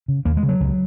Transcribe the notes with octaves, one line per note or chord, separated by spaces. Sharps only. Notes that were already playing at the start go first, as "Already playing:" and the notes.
C#3
D#2 A#3
G#3
C#3
F#3
C#2